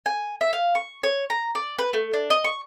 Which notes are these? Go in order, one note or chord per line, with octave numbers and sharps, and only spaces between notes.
G#5
E5
F5
C#6
C#5
A#5
D5
B4
A3
D4
D#5
C#6